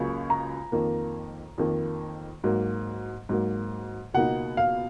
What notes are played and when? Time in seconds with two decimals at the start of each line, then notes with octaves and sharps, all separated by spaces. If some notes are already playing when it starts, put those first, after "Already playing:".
Already playing: C#2 C#3 F#3 A#3 C#6
0.30 A#5
0.72 F2 D#3 A#3
1.58 F2 D#3 A#3
2.44 G#2 F#3 A#3
3.29 G#2 F#3 A#3
4.14 C#2 B2 A#3 D#4 F#5
4.57 F5